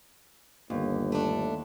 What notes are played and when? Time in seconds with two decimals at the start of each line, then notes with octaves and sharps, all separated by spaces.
0.70 G1 D#2
1.12 A3 D4